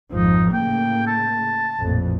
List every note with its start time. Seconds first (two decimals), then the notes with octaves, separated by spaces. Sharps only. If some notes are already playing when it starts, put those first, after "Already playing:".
0.12 G#1 F2 F3 D#4
0.53 A2 C#3 A#3 G5
1.07 A5
1.80 A1 F2 A#2